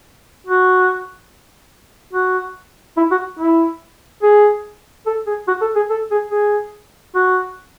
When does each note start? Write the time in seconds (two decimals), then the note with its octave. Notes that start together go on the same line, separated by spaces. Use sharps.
0.47 F#4
2.13 F#4
2.97 E4
3.11 F#4
3.39 E4
4.23 G#4
5.06 A4
5.27 G#4
5.48 F#4
5.61 A4
5.75 G#4
5.90 A4
6.11 G#4
6.32 G#4
7.15 F#4